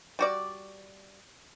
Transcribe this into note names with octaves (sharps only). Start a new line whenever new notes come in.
G3 F#4 D5